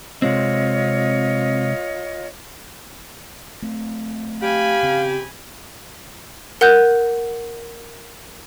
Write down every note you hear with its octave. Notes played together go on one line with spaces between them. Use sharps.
C3 G#3 C4 F4 C#5 D#5
A3 C4
G4 F5 G#5 B5
C#3 C4
A#4 F#5 F#6 G6